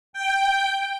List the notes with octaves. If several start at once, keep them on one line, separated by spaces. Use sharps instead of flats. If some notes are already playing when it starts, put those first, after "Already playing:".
G5